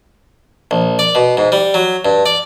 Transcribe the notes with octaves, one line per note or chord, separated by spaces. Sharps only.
A#1
D5
B2
G#2
G3
F#3
G2
D5